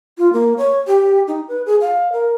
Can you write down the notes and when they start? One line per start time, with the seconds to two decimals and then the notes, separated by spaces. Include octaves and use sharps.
0.18 F4
0.33 A#3
0.58 C#5
0.87 G4
1.28 D#4
1.48 B4
1.66 G#4
1.81 F5
2.13 A#4